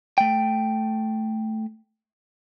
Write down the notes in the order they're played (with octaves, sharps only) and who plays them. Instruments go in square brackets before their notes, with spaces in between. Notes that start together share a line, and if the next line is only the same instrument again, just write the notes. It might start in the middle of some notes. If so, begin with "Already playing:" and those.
[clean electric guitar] A3 G5